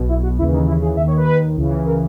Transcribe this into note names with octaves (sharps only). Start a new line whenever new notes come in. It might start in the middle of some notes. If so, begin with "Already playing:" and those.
Already playing: B1 B2
E4
F#4
D#2 C#3 E3 E4
D#4
E4
G#4
D#2 D#3 E5
C#5
B4
C#2 C#3 E3
A#4